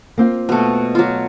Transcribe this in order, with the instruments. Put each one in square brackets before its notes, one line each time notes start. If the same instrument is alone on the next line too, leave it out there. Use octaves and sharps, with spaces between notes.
[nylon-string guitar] A#3 C4 F4
[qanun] B2 A3
F#3 F4